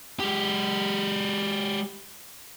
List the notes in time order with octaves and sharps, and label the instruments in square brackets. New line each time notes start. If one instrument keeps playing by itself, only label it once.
[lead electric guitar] G#3 G4